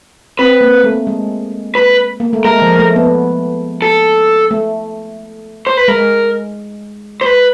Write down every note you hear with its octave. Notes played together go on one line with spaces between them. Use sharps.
C4 B4
A#3
A3
G#3
B4
A#3
A3
G#3 A#4
F3
A3
B3
A4
A3
C5
B4
G#3 A#4
C5
B4